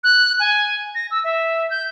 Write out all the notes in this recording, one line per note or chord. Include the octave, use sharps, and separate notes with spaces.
F#6
G#5
A#6
E6
E5
G6